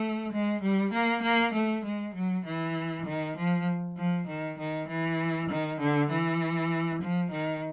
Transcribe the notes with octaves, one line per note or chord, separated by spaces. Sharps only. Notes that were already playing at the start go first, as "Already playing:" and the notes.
Already playing: A3
G#3
G3
A#3
A#3
A3
G#3
F#3
E3
D#3
F3
F3
D#3
D#3
E3
D#3
D3
E3
F3
D#3